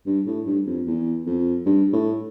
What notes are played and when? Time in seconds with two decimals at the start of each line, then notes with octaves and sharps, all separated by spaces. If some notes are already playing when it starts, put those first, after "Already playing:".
0.06 G2
0.26 A2
0.46 G2
0.66 F2
0.87 E2
1.26 F2
1.66 G2
1.93 A2